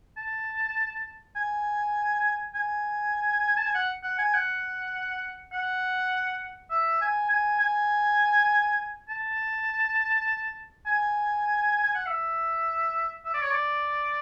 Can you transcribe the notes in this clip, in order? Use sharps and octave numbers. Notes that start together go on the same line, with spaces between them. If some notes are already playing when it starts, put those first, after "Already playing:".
A5
G#5
G#5
A5
G#5
F#5
F#5
G#5
F#5
F#5
E5
G#5
G#5
G#5
A5
G#5
G#5
F#5
E5
E5
D5
C#5
D5